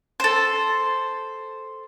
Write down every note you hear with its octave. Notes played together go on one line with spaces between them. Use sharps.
A4 C5